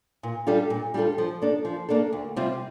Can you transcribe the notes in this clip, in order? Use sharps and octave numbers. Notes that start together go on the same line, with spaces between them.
A#2
G3 D4 F4 A4
A#2
G3 D4 F4 A4
F3
A#3 D4 A4
F3
A#3 D4 A4
D2
C3 G3 C4 F4